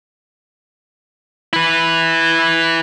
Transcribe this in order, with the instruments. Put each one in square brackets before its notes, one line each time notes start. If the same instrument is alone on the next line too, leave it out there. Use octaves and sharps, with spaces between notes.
[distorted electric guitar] E4 B4